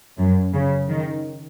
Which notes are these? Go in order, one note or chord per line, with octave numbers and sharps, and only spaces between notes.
F#2
C#3
D#3